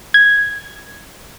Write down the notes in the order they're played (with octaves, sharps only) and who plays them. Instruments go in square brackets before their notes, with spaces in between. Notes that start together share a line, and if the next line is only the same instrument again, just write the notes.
[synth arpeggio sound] G#6